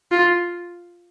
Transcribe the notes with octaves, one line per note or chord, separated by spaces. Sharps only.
F4